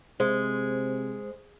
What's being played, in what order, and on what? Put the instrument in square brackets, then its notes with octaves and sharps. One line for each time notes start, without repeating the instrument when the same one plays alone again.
[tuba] C3 [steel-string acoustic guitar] G#3 [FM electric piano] C5